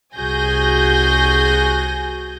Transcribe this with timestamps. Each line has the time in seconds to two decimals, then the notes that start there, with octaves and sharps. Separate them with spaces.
0.15 C2 F#4 G#4 G#5 G6 A#6